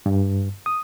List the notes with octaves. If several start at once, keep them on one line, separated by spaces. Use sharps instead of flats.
G2
D#6